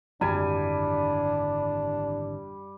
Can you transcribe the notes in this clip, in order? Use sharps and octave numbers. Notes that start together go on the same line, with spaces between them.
G#1 F#2 D3 E3 G3 D4 G#5